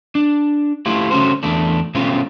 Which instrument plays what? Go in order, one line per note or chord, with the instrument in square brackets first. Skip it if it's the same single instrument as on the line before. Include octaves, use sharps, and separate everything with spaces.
[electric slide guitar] D4
A3 E4 F4 G4
C#3 A3 C#4 F#4 C5
E2 A3 D4
B2 G#3 A3 C4 C#4 F4